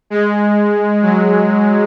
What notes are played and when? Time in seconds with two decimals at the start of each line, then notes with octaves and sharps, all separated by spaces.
0.10 G#3
1.03 F#3